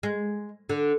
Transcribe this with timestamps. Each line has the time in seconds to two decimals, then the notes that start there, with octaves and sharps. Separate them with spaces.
0.03 G#3
0.69 D3